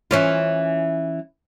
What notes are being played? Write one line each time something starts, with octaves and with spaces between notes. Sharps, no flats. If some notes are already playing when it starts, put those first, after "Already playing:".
E3 C#4 F4